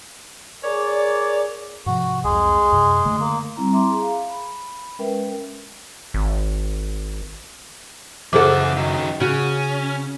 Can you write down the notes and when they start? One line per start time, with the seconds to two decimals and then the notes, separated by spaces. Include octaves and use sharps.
0.64 G#4 A#4 C#5 D5
1.86 G#2 C3 F3 F#4
2.24 C2 F2 G#3 G#4
2.72 F#2 C3
3.05 D3 A3
3.20 A#3
3.57 G3 C4 E4 A#5
3.73 E5 A#5 C6 D6
3.90 G#4 A#5
4.02 F5
4.29 B5
4.99 G#3 C#4 A#4 B4 E5 G5
6.14 G#1
8.33 F#2 C#3 E3 G#4 A4 C5 F#5 D6
8.77 D#3 F#3
9.20 C#3 C#4 F#4